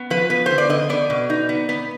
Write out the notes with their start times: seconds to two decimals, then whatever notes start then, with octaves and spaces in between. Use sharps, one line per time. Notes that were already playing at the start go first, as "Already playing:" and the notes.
Already playing: B3
0.10 F3 B4
0.30 B3 B4
0.46 D3 C5
0.58 D5
0.69 D3 D#5
0.89 B3 D5
1.10 B2
1.30 D#4
1.49 B3
1.69 B3